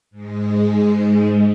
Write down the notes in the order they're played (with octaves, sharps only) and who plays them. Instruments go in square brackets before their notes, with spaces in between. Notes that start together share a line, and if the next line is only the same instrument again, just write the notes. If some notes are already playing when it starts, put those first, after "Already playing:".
[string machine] G#2 G#3